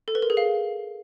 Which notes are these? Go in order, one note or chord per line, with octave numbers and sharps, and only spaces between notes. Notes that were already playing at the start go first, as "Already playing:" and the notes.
A4
B4
A#4
G#4
F5